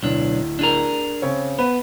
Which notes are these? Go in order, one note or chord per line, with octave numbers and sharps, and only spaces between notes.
D1 B1 D4
D4 G#4 A#4
C#3 C4 C#5
B3 B4